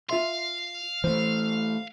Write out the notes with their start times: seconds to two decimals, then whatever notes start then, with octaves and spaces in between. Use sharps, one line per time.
0.09 F4 E5 F5 C6
1.04 E3 A3 C5